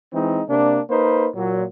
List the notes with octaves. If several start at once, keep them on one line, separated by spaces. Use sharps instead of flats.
E3 G#3 C4 D#4
C3 A#3 D4
A#3 D#4 B4 C5
A#2 F#3